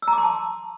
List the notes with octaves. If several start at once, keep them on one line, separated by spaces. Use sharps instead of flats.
E6
A#5
D6
C6
A5